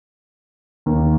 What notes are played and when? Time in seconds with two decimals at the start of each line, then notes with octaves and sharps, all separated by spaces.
0.86 D#2 D#3 A#3